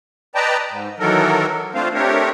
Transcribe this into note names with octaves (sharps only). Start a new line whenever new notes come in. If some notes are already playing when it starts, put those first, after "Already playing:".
B4 D5 D#5 G5 A5 A#5
G#2
D#3 E3 F#3 A4 A#4
A3 C4 D4 F4 C5 F5
A3 C4 D4 G4 A#4 C#5